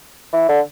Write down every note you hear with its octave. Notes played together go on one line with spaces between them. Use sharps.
E3
D3